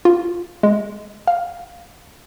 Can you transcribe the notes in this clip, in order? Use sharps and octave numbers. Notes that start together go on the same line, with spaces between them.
F4
G#3
F5